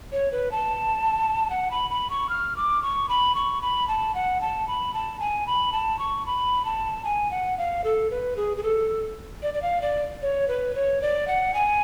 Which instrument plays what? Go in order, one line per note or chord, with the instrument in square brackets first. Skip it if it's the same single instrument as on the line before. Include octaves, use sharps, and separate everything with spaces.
[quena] C#5
B4
A5
F#5
B5
B5
C#6
F6
D6
C#6
B5
C#6
B5
A5
F#5
A5
B5
A5
G#5
B5
A5
C#6
B5
A5
G#5
F#5
F5
A4
B4
G#4
G#4
A4
D5
D5
F5
D5
C#5
B4
C#5
D5
F#5
G#5